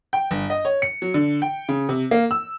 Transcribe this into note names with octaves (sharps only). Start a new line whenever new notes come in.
G5
G1
D#5
C#5
C#7
F#3
D3
G5
C#3
C3
A#3
E6